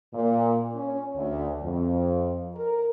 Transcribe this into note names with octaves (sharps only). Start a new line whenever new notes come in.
A#2
C#4
D2
F2
A#4